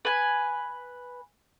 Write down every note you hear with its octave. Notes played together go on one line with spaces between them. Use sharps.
B4 G#5